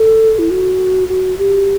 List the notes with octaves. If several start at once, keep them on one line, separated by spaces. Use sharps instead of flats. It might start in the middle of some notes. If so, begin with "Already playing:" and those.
Already playing: A4
E4
F#4
F#4
G4